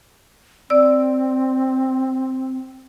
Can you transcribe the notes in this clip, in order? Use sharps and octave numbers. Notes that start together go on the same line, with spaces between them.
C4 D5 E6